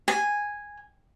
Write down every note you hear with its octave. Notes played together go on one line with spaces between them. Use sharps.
G#5